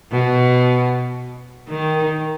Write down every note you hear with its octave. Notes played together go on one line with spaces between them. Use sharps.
B2
D#3